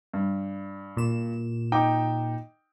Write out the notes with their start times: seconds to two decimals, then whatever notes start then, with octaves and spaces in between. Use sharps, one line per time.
0.14 G2
0.97 A#2 E7
1.72 D#4 G5 D6